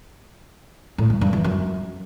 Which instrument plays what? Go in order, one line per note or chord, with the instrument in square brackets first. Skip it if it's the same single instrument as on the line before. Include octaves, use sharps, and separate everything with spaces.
[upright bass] A2
G2
G2
E3
F#2